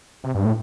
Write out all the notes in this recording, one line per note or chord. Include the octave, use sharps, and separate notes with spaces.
C3
G2
A2